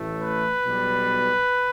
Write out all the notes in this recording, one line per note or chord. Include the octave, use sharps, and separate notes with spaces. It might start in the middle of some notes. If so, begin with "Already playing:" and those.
Already playing: A1 A2 E3 A3
B4
B1 B2 G3